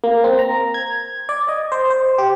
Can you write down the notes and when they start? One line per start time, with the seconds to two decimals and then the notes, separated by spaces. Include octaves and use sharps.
0.04 A#3
0.24 C4
0.39 A#5
0.74 G#6
1.29 D5
1.48 D#5
1.72 C5
1.90 C5
2.18 G4